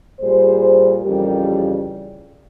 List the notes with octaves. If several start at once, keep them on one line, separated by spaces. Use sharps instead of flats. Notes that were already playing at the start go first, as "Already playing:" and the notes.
A#2 G3 G#4 C5
F2 C#3 E3 G3 G4 A#4